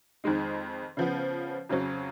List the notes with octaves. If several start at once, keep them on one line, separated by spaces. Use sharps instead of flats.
F2 D#3 G#3 D#4
C#3 F3 B3
F2 C#3 F#3